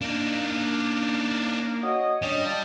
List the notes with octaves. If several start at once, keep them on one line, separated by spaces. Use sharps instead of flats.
A#3 D4 D#4
F#4 C#5 D#5
G3 C#4 D4 D#5
F4 D5 A5